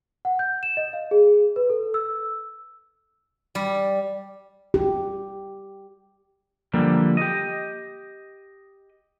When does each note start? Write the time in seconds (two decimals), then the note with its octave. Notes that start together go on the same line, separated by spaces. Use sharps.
0.25 F#5
0.39 G6
0.63 E7
0.77 D#5
0.93 F5
1.11 G#4
1.56 B4
1.70 A4
1.94 E6
3.55 G3
4.74 G4
6.74 D3 F3 G3 A#3
7.17 G4 D#5